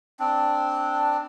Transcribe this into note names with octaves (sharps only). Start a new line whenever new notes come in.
C4 D4